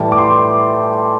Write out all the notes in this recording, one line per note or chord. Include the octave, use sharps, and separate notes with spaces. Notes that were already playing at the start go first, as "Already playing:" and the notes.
Already playing: A2 E3 G3 A5
D6
C6